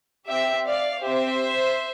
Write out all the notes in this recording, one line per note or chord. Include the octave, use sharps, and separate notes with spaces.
C4 G4 E5 G5
D5 F5
C4 G4 C5 E5